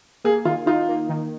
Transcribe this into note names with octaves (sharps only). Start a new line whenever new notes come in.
A#3 G#4
D#3 F4
D#4 F4
A#3
D#3